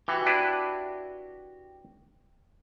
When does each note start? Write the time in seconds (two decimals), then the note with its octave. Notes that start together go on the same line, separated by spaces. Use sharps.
0.08 E3 F#4 G4
0.26 D4 E4 B4